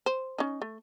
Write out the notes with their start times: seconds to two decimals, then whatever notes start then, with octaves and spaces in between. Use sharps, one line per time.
0.06 C5
0.38 C#4 D#4
0.62 A3